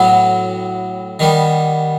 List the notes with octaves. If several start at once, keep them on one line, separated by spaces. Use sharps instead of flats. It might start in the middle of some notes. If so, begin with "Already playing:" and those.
Already playing: A2 F#3 B3
D#3 G3 B3